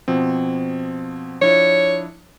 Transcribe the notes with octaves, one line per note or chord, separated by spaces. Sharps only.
B2 F3 C4
F3 D4 E4 C#5